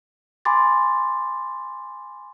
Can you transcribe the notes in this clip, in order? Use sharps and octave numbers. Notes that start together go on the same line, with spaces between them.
G#5 B5 C6 D6 A6